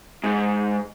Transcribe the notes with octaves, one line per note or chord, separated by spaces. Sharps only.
G#2